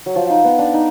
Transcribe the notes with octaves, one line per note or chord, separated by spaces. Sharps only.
F#3
F3
D#4
B3
D4
D#4